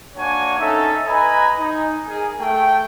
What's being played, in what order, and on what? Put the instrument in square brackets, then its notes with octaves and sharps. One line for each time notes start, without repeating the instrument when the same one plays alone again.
[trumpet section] A#3 D4 F#4 C#5 G#5
C#4 D#4 A4 E5 A5
B4 D#5 G#5 A#5 B5
D#4
G#4 A#4 G#5
A3 G5